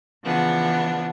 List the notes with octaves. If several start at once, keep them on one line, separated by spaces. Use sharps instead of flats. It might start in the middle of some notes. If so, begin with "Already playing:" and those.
C#3 E3 F3 B3 D4